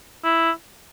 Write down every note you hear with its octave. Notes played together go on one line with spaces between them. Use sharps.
E4